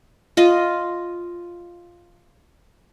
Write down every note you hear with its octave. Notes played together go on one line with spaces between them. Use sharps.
F4 D#5